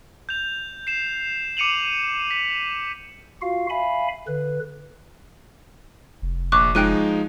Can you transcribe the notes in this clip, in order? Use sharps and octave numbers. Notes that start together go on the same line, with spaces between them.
G6 F7
C7 E7
D6 C#7 D#7 F7 F#7
B6
F4 F#4 F5
E5 F5 G#5 B5
D3 B4
F1
A#1 C#6 D6 F#6
F3 G#3 D#4 G5 F#6 D#7